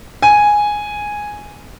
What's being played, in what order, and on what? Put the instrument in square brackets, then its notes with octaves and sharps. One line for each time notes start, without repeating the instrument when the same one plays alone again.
[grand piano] G#5